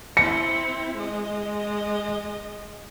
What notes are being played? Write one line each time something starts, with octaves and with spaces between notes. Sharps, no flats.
C4 E4 C#7
G#3 D#5